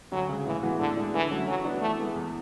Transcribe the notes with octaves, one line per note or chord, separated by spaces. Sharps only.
D2 F#3
C#3 G#3
A2 E3
E3 G#3 B3 F#4
A2 D3
G#3 D4
D3 E3
F#3 A3 C#4 F#4
E3 F#3
B3 D4 F#4
E3 A3
G#3 B3
E2